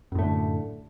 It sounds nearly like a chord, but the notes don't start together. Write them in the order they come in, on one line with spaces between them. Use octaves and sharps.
F#2 A2 A3 D3